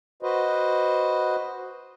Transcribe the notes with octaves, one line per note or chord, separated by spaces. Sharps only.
F#4 B4 C5 D#5